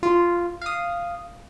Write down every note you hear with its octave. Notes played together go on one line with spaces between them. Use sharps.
F4
F5 D#6